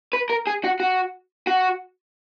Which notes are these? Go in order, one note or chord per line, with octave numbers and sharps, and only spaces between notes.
B4
A#4
G#4
F#4
F#4
F#4